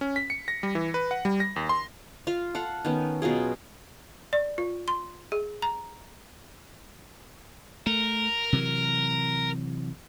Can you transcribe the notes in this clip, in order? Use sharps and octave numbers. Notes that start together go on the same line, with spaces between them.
C#4
B6
C#7
A#6
G3
E3
B4
F#5
G3
A#6
D#2
C6
F4 F5
A4 F5 F#5
D#3 B3 C#4
B2 F#3 F4 G#4
D5
F4
C6
G#4
A#5
A3 A#4
C3 E3 F#3